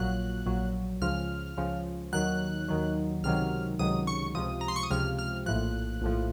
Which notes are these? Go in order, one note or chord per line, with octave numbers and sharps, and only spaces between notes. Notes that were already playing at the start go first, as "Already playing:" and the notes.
Already playing: A#1 A#2 F#3 F#6
A#1 A#2 F#3
C#2 C#3 F3 F6
C#2 C#3 F3
D#2 D#3 F#3 F#6
D#2 D#3 F#3
C#2 C3 D#3 F#3 F6
C#2 C3 D#3 F#3 D#6
C#6
C#2 C3 F3 D#6
A#5
C6
C#6
D#6
C#2 C3 F3 F6
F6
A#1 A2 F3 F#6
A#1 A2 F3